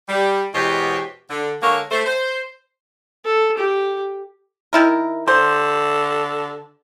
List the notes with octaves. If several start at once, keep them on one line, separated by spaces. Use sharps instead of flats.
G3
E2 B2 G#3 G4 C5 C#5
D3
D3 G#3 A#3 A#4 C#5
A3 C5
C5
A4
G4
D#3 E4 A#4
D3 C5